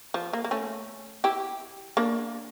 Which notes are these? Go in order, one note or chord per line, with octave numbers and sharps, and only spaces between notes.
F3
A#3
A#3
A3 C#4
E4 G4
A#3 D4